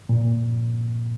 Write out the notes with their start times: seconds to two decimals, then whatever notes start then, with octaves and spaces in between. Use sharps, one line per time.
0.09 A#2